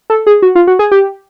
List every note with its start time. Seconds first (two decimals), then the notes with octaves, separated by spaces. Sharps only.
0.10 A4
0.27 G#4
0.42 F#4
0.55 F4
0.67 F#4
0.79 G#4
0.92 G4